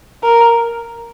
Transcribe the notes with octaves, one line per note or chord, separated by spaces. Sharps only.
A#4